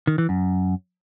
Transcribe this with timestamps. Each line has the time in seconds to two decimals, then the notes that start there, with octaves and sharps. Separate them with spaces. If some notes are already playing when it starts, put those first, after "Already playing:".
0.07 D#3
0.18 E3
0.29 F#2